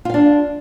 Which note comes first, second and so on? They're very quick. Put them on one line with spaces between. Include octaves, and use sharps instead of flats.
F4 F5 D4